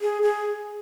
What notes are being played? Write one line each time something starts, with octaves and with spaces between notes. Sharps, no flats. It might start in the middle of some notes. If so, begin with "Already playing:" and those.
G#4
G#4